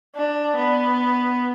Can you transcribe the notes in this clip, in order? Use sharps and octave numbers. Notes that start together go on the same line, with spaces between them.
D4
B3